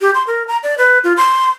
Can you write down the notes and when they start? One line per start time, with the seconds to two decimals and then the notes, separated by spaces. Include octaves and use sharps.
0.01 G4
0.15 C6
0.27 A#4
0.48 A#5
0.63 D5
0.78 B4
1.04 F4
1.17 C6